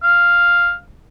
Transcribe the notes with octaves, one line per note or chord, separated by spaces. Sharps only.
F5